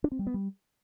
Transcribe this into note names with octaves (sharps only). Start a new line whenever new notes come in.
D4
C4
G3
B3
G3